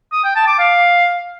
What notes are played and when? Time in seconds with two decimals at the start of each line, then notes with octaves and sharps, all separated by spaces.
0.12 D#6
0.24 G5
0.36 A5
0.47 D6
0.59 F5